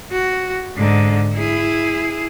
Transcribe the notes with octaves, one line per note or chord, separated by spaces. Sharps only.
F#4
G#2 D3
E4 G#4